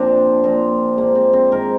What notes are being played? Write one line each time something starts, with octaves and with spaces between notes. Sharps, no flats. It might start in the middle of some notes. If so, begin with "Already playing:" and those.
Already playing: A#2 F3 C4 D4 F4
A#2 F3
G#2 F3 A#3
C4
C4
G#2 D#3 A#4